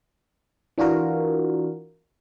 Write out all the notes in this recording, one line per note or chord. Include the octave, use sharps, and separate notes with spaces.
E3 D4 F4 F#4 A#4